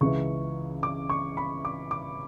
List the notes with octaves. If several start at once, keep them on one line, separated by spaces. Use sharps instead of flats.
C#2 C#3 E3 C#6
D6
C#6
B5
D6
D6